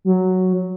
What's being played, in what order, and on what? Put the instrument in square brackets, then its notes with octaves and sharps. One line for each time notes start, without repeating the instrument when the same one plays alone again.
[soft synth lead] F#3